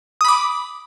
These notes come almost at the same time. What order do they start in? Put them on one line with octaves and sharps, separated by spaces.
D#6 B5 D6